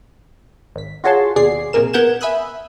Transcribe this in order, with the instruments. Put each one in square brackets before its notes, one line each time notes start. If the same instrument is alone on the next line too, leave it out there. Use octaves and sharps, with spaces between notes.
[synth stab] G#1 B6
F4 F#4 G#4 C#5 A5 C6
D#2 B2 G#4 D5 C7
A#1 C3 A#3 G#4 A#4 E7
B3 A#4 F#5 G6 G#6 E7
E5 G#5 B5 D#6 E6 F#6